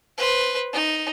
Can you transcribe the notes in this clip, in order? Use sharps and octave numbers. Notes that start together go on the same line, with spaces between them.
B4 C5
D#4